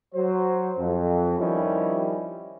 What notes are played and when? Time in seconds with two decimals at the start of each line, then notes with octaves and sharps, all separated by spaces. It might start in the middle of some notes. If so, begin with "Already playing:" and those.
0.14 F#3 C5
0.77 F2
1.39 D#3 F3 G3 C#4 E4 G4